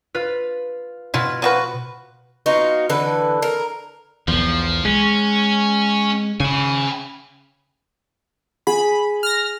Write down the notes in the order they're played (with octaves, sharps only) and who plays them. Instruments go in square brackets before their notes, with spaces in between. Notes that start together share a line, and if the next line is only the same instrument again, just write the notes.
[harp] F4 B4
[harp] B2 [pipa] E4 F4
[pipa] F3 F#4 B4
[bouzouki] B3 D#4 F4 F#4
D3 E3 B4
A#4
[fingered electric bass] B1 E2 [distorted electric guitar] F3
[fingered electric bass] G#3 [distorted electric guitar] C#4
[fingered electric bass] C#3 [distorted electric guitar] G#5 B5
[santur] G#4 [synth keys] B5
[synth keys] F6 A#6